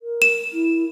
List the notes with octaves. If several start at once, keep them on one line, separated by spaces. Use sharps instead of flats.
A#4
E7
E4